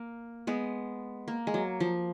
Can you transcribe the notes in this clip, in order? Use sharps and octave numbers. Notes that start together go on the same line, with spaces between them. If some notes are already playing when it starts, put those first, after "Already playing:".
Already playing: A#3
G#3 B3
A#3
G#3
F#3
F3